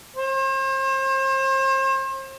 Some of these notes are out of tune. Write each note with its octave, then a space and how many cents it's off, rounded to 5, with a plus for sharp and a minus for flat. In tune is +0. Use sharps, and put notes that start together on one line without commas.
C5 +40